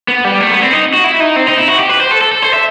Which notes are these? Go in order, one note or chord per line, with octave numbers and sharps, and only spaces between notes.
B3
G3
A3
B3
C4
D#4
F#4
E4
D#4
C4
D#4
E4
F#4
G4
B4
C5
A4
A4
A4
C5
E5